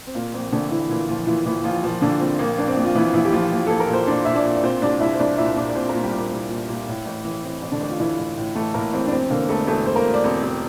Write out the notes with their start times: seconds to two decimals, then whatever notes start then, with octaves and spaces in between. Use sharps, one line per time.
0.07 C4
0.15 A#2 A#3
0.33 A#1 C4
0.52 A#1 D3 D4
0.71 A#1 E3 E4
0.89 A#2 E3 E4
1.08 A#1 F3 F4
1.27 A#2 E3 E4
1.46 A#1 E3 E4
1.64 A#1 F3 F4
1.83 A#2 F3 F4
2.02 A#1 D3 D4
2.20 A#2 C4
2.39 A#1 A#3
2.58 A#1 D4
2.67 C4
2.76 A#1
2.84 F4
2.95 A#1 E3 E4
3.14 A#1 E3 E4
3.25 G4
3.32 A#1 F3 F4
3.51 A#1
3.66 A#1 A4
3.80 A#4
3.89 A#2 C5
4.07 A#2 D4 D5
4.25 A#2 E5
4.35 D4 D5
4.45 A#2
4.56 D5
4.63 A#2 C4 C5
4.82 C2 D4 D5
5.00 C2 E4 E5
5.14 C5
5.19 C2 D4 D5
5.38 A#2 E4 E5
5.57 A#2 D4 D5
5.69 D5
5.75 A#2 C4 C5
5.89 A#3 A#4
5.94 A#2
6.03 G3 G4
6.12 A#2
6.18 A#3
6.31 C2
6.50 A#2
6.69 A#2
6.88 A2
7.06 A1
7.25 E3
7.43 E3 C4
7.62 A1
7.71 D3 D4
7.80 A1
7.89 F4
8.00 A1 E3 E4
8.18 A1
8.37 A2
8.55 E3 A3 A4
8.74 A2 A#3 A#4
8.93 A1 C4
9.06 D4
9.12 E1 C4
9.30 D3 A#3
9.49 E1 A3 A4
9.67 E1 A3 A4
9.86 E1 C5
9.96 A#3 A#4
10.05 E1
10.14 D5
10.24 E1 C4 C5
10.43 E1